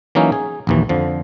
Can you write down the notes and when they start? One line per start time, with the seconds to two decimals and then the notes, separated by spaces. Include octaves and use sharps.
0.15 E3 F#3 A#3 C#4 D#4 E4
0.32 G#4
0.67 A#1 D#2 E3
0.89 F2 D3 F3